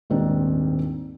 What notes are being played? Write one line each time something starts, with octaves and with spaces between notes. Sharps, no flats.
D#1 G#2 D#3 C4 D4